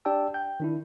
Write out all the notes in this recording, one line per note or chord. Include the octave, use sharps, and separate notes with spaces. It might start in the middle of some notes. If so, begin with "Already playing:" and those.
D4 G4 D5 G5 A5 E6
G5 G6
D#3 D4 E4